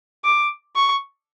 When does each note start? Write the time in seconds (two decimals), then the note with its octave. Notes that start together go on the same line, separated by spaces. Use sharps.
0.24 D6
0.76 C#6